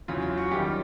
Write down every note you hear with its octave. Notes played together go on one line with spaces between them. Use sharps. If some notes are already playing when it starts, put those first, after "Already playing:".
E2 C#3 F#3 F4
F4
F#4
F#2 D#3 G3 F4 G4